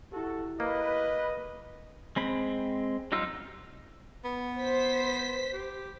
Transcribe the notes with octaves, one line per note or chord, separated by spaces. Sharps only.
E4 F#4 G4 A4
A#3 B4 D#5
G#3 C4 B5
F#3 G3 D#4 F4 E6
B3
C5 B6
G4